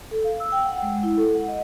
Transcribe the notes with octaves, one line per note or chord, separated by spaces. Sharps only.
A4
F5
E6
G5
F#5
G#3
E4
A4
F#5
D#5